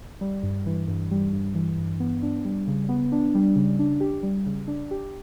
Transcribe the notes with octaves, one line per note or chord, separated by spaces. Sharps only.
G3
G2
E3
G2
G3
G2
E3
G2
B3
D4
G3
C#3
B3
D4
G3
C#3
D4
G4
G3
C#3
D4
G4